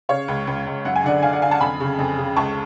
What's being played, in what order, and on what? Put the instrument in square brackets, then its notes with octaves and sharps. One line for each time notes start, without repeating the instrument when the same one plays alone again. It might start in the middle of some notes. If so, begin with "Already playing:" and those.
[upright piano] C#3 C#5 F5
C#2
C#2
C#2
F#2 F#5
G#5
D3 D5 F#5
D3 F5 G#5
D5 F#5
D3 F5 G#5
F#5 A5
F2 G#5 B5
C#3
F2
C#3
C#2 A5 C#6